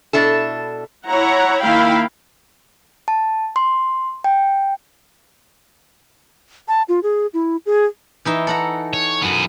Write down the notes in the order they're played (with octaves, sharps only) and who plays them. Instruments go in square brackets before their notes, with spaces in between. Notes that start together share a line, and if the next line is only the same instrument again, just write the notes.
[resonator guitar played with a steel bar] B2 D4 E4 A4
[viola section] E4 C#5 F#5 A#5
D#3 A#3 E4 F5 G5 B5
[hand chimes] A5
C6
G5
[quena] A5
F4
G#4
E4
G#4
[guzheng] E3 D#4 E5
A4 F#5 A#5
[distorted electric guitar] C#5
F#2 B3